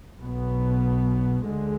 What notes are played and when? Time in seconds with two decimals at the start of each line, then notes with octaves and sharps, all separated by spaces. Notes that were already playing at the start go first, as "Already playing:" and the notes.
0.21 B1 B2 B3
1.46 D2 D3 G#3